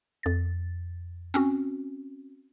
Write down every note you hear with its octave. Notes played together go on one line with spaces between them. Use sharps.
F2 A6
C4 C#4 F#4